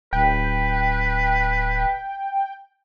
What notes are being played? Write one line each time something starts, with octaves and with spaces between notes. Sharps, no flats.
D1 B4 G5